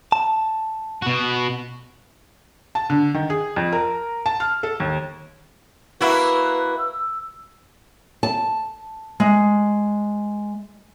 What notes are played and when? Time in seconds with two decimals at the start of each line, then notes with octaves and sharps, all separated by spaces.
0.12 A5
1.02 B2 F#4
2.75 A5
2.90 D3
3.14 D#3
3.30 G#4
3.56 F2
3.72 A#4
4.26 A5
4.40 F6
4.63 A4
4.80 D#2
6.01 A#3 E4 F#4 B4
6.79 E6
8.23 A5
9.20 G#3